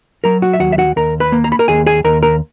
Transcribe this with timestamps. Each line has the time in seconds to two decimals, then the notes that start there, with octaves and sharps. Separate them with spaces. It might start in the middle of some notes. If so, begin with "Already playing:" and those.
0.24 F#3 A#4 A#5
0.42 F#4 F#5
0.53 E5
0.60 D#2 F#4 F#5
0.72 E5
0.78 F#4 F#5
0.96 D#2 A#4 A#5
1.20 B4 B5
1.32 A#3
1.44 A#5
1.52 B5
1.59 A#4 A#5
1.68 D#2 G#4 G#5
1.86 G#4 G#5
2.04 D#2 A#4 A#5
2.23 A#4 A#5